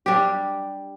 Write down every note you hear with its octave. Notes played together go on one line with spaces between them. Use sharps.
G3 D4 G4